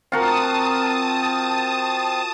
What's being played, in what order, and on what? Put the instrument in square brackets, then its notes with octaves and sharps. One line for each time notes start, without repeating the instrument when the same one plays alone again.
[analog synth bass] C4 [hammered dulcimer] F4 F#4 A#4 [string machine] A5 D#6